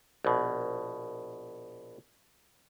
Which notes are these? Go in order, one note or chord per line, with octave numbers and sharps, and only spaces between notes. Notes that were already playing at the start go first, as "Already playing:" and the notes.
A#1 B2